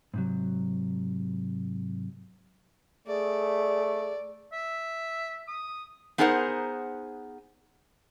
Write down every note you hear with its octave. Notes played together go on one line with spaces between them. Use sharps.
G#2 C3 F#3
A3 G#4 D5
E5
D#6
B3 D#4 G#4 A#4 C5 F#5